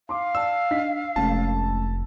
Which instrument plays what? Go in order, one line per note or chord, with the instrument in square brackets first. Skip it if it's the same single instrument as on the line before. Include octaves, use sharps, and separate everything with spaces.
[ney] F5 [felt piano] C6 D6
[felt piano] D5 A5 [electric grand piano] E6
[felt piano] D4 D#5 B6
[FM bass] F1 [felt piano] G#3 A3 C#4 [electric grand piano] A5